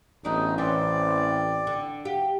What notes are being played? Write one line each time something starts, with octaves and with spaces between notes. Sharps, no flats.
A1 B3 D4 D#4 F#4
E3 C4 C#4 D5 G5 C6
G5
D3
G4 F5 F#5